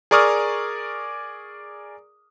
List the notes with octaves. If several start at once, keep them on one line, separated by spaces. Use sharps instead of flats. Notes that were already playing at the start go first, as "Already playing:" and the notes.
G#4 A#4 D5 C#6 D#6 F6